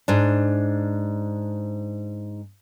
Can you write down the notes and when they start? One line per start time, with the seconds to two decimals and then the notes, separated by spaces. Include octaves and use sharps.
0.08 G#2 D4